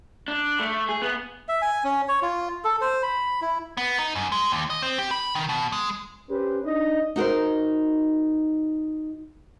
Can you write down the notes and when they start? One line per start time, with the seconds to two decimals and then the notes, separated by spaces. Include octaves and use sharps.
0.28 D4
0.59 A3
0.89 G#4
1.02 B3
1.48 E5
1.62 G#5
1.84 C#4
2.08 C#5
2.22 F4
2.64 A4
2.81 C5
3.03 B5
3.42 E4
3.77 B3
3.99 D#4
4.15 F#2
4.32 G#3
4.52 D#2
4.70 D#5
4.82 C4
4.98 G4
5.11 B5
5.35 D#3
5.49 B2
5.72 G#3
6.30 C#4 G4 B4 C5
6.65 D4 D#4 D#5
7.16 D#4 F#4 A#4 C5